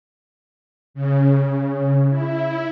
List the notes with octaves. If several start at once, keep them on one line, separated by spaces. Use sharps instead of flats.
C#3
E4